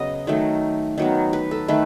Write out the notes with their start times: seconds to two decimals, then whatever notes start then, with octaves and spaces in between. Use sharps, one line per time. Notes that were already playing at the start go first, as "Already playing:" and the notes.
Already playing: C#3 F#3 B3 D#5
0.27 D#3 F#3 A3
0.98 D#3 F#3 B3
1.33 B4
1.51 A4
1.68 D#3 A3 B4